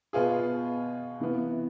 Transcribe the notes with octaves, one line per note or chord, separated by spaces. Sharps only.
B2 B3 F4 G#4
C3 E3 B3